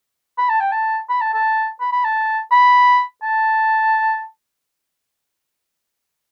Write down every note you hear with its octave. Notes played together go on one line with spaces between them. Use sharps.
B5
A5
G5
A5
B5
A5
A5
B5
B5
A5
B5
A5